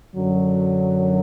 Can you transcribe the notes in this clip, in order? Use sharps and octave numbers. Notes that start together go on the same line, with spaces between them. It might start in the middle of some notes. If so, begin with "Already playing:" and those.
F#2 D3 F#3